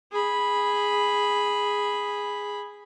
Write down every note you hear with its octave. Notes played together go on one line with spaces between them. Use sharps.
G#4 B5